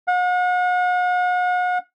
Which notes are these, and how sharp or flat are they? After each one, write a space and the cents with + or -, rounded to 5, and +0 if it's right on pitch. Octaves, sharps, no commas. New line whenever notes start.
F#5 -40